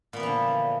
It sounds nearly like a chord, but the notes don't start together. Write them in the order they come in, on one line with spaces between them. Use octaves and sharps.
A#2 B3 E3 F3 D3